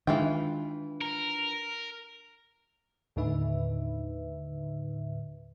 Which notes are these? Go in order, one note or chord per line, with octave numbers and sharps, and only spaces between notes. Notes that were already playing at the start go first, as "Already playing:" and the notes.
D#3 E3 G#3 D4 F4 G5
A#4
D#2 A2 D3 D#4 B4 E5